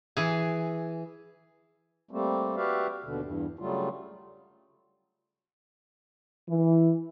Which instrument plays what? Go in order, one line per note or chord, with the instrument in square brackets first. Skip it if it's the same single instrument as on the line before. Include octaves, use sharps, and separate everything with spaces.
[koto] E3 G#4
[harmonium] G3 A3 A#3 C4
F#4 G4 B4 D5 E5 F5
D#2 B2 D3
E2 G2
C#3 F#3 G3 A3 F4
[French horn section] E3